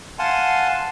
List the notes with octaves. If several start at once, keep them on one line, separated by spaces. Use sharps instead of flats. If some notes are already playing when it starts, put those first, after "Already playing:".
F5 F#5 G#5 A5 C6